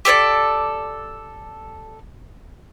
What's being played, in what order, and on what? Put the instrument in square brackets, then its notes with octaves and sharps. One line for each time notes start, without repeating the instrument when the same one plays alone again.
[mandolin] G4 A4 C#5 D5